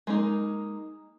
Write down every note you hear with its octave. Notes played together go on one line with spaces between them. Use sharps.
G#3 A#3 D#4 A#4